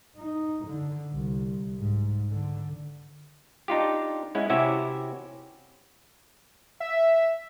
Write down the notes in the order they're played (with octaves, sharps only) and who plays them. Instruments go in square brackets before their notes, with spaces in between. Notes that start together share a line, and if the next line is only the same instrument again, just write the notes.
[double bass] D#4
D3
C2
G#2
D3
[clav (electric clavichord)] D4 D#4 F4 G4
G#3 C#4 E4 F#5
C3 C#4 E4 F#4 G4 E5
[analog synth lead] E5